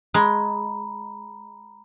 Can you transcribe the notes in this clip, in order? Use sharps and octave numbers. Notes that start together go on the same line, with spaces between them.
G#3 A#5 B5